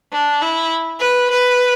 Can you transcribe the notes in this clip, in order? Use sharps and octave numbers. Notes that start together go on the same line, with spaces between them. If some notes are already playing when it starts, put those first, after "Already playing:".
D4
E4
B4
B4